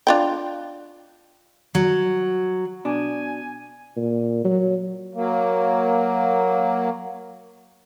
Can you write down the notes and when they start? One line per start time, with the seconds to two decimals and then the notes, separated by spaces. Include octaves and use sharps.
0.07 D4 F4 G5
1.75 F#3
2.85 B2 D4 G#5
3.96 A#2
4.45 F#3
5.15 F#3 A#3